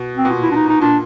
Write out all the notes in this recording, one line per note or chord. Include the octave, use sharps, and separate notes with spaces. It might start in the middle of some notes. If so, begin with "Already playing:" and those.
Already playing: B2
C4
B2
A#2
E4
D4
D#4
D#4
A#2 D4